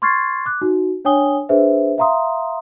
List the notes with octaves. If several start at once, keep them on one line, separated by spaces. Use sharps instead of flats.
C6 C#6 F6 G#6 A6 C7
D6 F#6
D#4 F#4
D4 C#5 G5 G#5 D#6 G7
D4 G#4 B4 C5 E5
E5 F5 A#5 C6 D#6